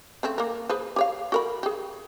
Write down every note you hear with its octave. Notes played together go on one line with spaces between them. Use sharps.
C#3 A3 C4
A#3 A#4
G#4 B4 C5
G4 C#5 F5
F#4 A#4 B5
G4 G#4